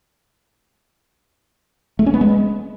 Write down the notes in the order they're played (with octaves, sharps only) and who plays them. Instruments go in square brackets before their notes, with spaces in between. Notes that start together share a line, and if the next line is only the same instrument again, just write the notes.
[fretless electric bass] A3
C#4
B3
G#3